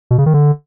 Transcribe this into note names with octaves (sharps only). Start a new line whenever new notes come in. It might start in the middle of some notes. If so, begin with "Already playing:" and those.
B2
C#3
D#3
D3